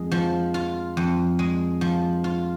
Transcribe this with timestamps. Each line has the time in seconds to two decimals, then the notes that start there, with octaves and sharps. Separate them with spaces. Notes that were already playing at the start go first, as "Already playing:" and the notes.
Already playing: F2 G#3
0.11 F3
0.54 F4
0.97 F2
1.39 G#3
1.81 F3
2.24 F4